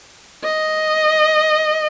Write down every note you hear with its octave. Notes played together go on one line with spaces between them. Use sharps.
D#5